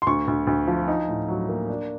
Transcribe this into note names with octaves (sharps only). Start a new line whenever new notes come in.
C6
D2 C#6
D2
D2
F3
D#4
A2
F#3
A#3
D4